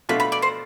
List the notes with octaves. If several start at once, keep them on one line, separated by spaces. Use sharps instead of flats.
B2 A3 D4 F4 B5
B5
D5
C5